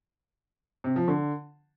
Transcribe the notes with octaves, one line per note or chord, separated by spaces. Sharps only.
C3
F3
D3